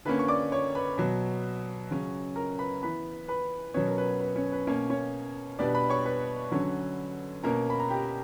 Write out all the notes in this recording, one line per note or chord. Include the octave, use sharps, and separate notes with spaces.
D3 A#3 C#4 B4 B5
C#6
D5 D6
C#5 C#6
B4 B5
B2 F#3 B3
C#3 F#3 C#4
A#4 A#5
B4 B5
E3 B3 B4 B5
B4 B5
B2 F#3 B3 C#4 C#5
A#4
B4
B4
C#4 C#5
B4
B2 A#3 C#4 C#5
C#4 C#5
B2 G3 B3 D4 D5
B4 B5
C#5 C#6
B4 B5
D3 F#3 C#4
B2 A#3 C#4 A#4 A#5
B5
A#5
G4 G5